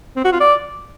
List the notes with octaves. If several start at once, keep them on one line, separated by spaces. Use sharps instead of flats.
C4
F#4
F4
D5